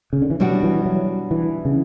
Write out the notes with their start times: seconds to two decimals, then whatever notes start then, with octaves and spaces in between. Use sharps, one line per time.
0.13 C#3
0.22 D3
0.30 E3
0.40 B2 F#3 G3 D4 F#4
0.63 E3
0.85 F#3
1.31 E3
1.65 C#3